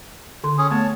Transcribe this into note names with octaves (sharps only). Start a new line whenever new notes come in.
D3 C6
C#4 G#4
A3 B3 C#5 A5